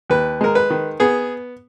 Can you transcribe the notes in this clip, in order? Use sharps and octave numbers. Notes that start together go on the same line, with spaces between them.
D#2 B4
G#3 A#4
B4
D#3
B3 G#4